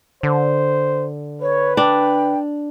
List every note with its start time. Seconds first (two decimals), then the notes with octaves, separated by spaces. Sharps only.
0.23 D3 C5
1.42 B4 C#5
1.77 D4 G5